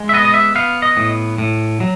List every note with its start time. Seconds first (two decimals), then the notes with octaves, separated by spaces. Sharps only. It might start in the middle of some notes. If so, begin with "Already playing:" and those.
Already playing: G#3
0.09 E5
0.13 B3 D#5
0.25 D#5
0.34 E5
0.56 B3 F5
0.82 D#5
0.97 A2
1.38 A2
1.80 F#3